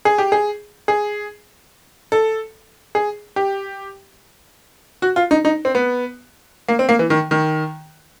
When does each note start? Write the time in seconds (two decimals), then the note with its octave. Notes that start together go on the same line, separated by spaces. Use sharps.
0.05 G#4
0.18 G4
0.32 G#4
0.88 G#4
2.12 A4
2.95 G#4
3.36 G4
5.02 F#4
5.16 F4
5.31 D#4
5.45 D#4
5.65 C4
5.75 B3
6.69 A#3
6.79 C4
6.89 A#3
6.99 E3
7.10 D#3
7.31 D#3